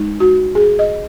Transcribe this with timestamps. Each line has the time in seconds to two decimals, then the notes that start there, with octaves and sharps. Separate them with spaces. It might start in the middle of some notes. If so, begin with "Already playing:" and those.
Already playing: G#3 D#4
0.20 F#4
0.55 G#4
0.79 D#5